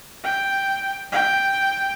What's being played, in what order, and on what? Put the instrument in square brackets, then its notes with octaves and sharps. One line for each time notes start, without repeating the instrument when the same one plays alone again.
[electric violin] G5
G5